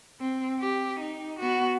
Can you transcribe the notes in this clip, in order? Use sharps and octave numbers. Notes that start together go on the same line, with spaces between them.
C4
G4
D#4
B3 F#4